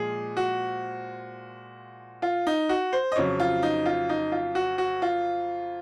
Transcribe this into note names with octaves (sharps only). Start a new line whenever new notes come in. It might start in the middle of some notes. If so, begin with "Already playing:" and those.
Already playing: A#2 F3 G#3 G#4
F#4
F4
D#4
F#4
C5
D#5
F2 C#3 F#3 C#5
F4
D#4
F4
D#4
F4
F#4
F#4
F4